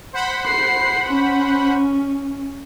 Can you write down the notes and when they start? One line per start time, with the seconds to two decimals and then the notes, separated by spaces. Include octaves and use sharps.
0.13 C5 F#5 B5
0.46 C7
1.09 C#4